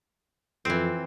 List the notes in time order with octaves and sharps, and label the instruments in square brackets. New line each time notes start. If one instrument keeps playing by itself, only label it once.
[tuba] F2 [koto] E3 C4